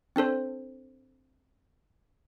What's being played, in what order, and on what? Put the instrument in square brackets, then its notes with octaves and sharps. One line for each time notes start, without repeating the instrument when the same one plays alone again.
[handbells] C4 D4 A4 C5